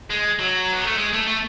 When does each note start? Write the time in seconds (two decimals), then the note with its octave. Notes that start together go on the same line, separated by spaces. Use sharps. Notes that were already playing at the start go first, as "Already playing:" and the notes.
0.10 G#3
0.39 F#3
0.72 B3
0.85 A3
0.98 G#3
1.13 A3
1.27 A3